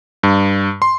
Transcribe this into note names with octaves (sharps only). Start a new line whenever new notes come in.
G2
C6